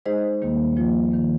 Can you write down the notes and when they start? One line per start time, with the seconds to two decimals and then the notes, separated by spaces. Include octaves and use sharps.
0.06 G#3 D#4 G#4 C5 D#5
0.42 D#2 D#3 G3 A#3
0.77 F3 A#3 F4
1.11 D#3 A#3